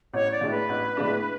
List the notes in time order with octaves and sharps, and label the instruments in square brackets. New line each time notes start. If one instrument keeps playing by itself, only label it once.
[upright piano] A1 [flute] C#5
[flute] D5
[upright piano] A2 G#3 D4
[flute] B4
[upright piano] A1
A2 G#3 D4